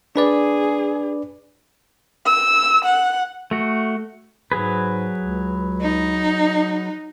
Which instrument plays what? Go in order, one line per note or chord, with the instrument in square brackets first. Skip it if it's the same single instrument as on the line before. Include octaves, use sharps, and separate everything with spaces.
[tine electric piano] D4 B4 D5 [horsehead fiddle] G#4
[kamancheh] E6
F#5
[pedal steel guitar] A3 F#4
[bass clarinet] G#2 [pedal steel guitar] F#3 G#4 B4
[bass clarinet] C#2
[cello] D#4